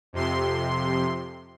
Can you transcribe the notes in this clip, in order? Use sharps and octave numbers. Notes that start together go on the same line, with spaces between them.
F2 C3 C6